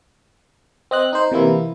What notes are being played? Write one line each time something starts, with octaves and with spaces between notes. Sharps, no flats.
C4 D#5 F#6
D#4 C5
C3 E3 A#3 E4